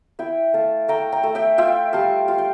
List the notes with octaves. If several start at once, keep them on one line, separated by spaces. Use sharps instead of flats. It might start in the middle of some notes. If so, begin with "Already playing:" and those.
E4 E5 G5
A3 F5 A5
A3 G5 A#5
G5 A#5
A3
E5 G5
F4 E5 G5
G3 F5 A5
F4 F5
G5